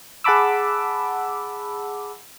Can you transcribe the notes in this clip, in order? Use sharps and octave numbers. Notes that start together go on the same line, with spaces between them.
G#4 F#5 A5 B5 D6 E6